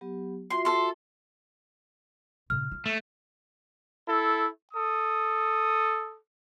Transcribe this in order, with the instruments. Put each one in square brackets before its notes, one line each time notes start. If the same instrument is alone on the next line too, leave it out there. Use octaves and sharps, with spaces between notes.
[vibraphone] F#3 B3 G4
[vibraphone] F4 F#4 E5 [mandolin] C6
[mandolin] A4 C6
[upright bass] A#2 C#3 [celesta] F6
[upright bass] F4
[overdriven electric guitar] A3
[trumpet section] E4 A4
A4 D#6